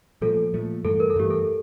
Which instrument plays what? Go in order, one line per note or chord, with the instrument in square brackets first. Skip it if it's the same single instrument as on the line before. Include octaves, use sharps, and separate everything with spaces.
[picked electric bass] A#2 F3 A3 [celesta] A4
[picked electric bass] A#2 F3 A3
[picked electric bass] G2 E3 A3 [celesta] A4
[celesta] A#4
A4
[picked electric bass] G2 E3 A3 [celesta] G4
[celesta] A4